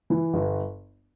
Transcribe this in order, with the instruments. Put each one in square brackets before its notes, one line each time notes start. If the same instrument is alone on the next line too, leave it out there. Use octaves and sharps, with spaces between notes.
[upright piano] E3
G1